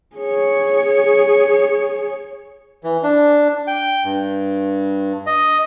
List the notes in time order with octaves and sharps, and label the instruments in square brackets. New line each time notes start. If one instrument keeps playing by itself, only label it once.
[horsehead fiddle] G#4 C#5
[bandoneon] E3
D4
G5
G2
D#5